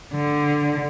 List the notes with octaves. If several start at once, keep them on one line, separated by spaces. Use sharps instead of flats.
D3